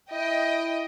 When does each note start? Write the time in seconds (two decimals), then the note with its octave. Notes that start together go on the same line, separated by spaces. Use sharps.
0.11 E4 D#5 G5